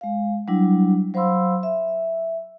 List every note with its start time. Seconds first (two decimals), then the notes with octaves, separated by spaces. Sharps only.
0.01 G#3 F5
0.48 F#3 G3 D4 E4
1.14 F#3 C5 F5 B5 C6 E6
1.63 E5